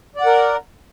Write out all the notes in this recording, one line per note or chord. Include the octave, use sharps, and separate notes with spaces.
A#4 D5 F#5